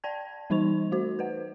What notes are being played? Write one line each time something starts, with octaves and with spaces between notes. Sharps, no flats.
D5 G5 A5 G#6
E3 G3 D#4 C5 C#6 F7
A3 F#4 C5
B4 C5 F#5